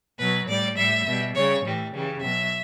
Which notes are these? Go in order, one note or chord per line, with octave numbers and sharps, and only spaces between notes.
B2 F#3 B4
A2 G3 D5
A2 G3 E5
B2 G3
C#3 G3 C#5
A2 E3 G3
C#3 E3 G3
B2 F#3 E5